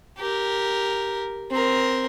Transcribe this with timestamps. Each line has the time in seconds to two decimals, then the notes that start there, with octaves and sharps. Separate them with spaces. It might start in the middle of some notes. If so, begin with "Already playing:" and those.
0.18 G4 A#4
1.51 C4 A#4